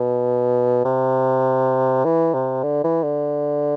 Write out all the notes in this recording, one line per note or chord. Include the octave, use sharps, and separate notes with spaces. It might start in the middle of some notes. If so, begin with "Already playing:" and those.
Already playing: B2
C3
E3
C3
D3
E3
D3